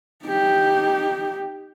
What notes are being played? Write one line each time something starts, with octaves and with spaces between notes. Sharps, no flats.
D#4 G4